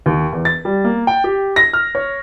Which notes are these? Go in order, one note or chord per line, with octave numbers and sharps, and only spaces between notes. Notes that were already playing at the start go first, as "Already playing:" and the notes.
D#2
E2
A6
G3
A#3
G5
G4
A#6
F6
C#5